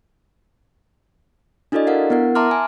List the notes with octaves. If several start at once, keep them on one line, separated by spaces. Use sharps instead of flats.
D4 E4 F#4 A4 D5 D#5
D4 A#4 F5 F#5
B3 E4 A#4 F#5
E5 A5 A#5 C6 D6 F6
G#5